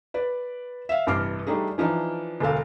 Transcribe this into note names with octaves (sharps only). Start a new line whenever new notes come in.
B4 D5
E5 F5
A1 G2 C3 D6 F6 C7
G3 A3 D4 D#4 G#4
E3 F3 D4 D#4
E1 D2 A4 F5